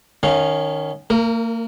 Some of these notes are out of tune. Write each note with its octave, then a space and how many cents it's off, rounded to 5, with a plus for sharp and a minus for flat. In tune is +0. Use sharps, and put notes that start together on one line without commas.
D#3 -20 C#4 +0 F5 +0
A#3 -35 A#4 +0